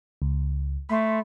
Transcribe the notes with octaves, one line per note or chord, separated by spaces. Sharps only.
C#2
A3 B5 C6